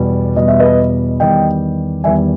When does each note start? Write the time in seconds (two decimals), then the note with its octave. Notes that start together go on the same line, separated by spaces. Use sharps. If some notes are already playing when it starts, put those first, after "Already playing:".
Already playing: E2 B2 G3
0.36 E2 B2 G3 D#5
0.48 E5
0.59 B4 D#5
1.20 E2 D#3 G3 D#5 G5
2.04 E2 D#3 G3 E5 G#5